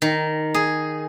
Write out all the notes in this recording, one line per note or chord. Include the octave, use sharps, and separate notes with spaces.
D#3
G#4